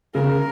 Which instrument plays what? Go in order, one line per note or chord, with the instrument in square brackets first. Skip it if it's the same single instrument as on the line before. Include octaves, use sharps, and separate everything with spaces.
[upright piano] C#3 [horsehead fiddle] A#4